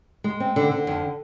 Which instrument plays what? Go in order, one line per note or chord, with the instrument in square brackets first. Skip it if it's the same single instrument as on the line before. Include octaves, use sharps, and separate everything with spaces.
[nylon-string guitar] G#3
C4
D3
D3
F2